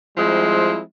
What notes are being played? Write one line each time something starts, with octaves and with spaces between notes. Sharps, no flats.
F3 G3 G#3 C4 E4